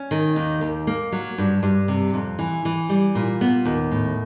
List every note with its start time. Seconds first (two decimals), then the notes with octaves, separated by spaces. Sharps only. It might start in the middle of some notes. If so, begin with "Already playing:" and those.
Already playing: C#4
0.11 D#3
0.36 D#2
0.61 D#2
0.87 A#3
1.12 F#3
1.38 G2
1.63 G2
1.88 C3
2.14 F2
2.39 E3
2.65 E3
2.89 G3
3.15 A#2
3.41 B3
3.65 D#2
3.91 A2